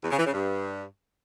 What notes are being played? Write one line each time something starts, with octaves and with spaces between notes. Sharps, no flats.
E2
C#3
E3
C#3
G2